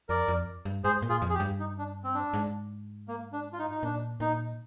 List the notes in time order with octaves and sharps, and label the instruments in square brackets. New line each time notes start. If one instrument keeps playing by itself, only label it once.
[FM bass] F2 [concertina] A#4 D5
[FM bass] F2
G2
[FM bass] G#2 [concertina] G#4 C5
[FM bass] A#2
[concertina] F4 G#4
[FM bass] F2
[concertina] G#4
G4
[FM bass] G2
[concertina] D#4
D4
C4
D4
[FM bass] G#2
[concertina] A#3
D4
F4
D#4
D#4
[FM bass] A#2 [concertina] D4
[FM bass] A#2 [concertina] D#4